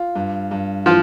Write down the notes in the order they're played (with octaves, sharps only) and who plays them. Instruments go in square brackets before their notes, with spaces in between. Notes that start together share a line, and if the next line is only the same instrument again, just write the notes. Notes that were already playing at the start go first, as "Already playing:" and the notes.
Already playing: [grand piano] F4
G2
G2
[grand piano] E3 [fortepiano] F3 F4